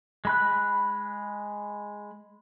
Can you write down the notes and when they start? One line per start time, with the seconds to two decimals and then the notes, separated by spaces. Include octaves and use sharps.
0.25 G#3 B5 F#6